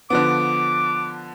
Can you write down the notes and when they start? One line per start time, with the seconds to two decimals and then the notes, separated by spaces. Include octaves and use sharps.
0.10 D3 F3 B3 D6